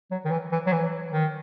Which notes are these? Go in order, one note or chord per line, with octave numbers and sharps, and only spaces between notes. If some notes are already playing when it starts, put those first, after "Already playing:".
F#3
D#3
E3
E3
F#3
E3
D#3